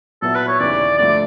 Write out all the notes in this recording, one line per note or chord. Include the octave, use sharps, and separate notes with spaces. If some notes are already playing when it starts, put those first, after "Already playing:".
A#2 F#3 B3 E4 A4
B4
C#5
D#2 C#3 E3 D5
G2 D3 F3 A3 D5